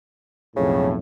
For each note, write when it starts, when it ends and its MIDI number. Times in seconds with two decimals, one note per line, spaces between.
0.56 0.97 35
0.56 0.97 41
0.56 0.97 45
0.56 0.90 49